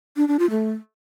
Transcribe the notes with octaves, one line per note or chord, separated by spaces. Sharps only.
D4
D4
F4
A3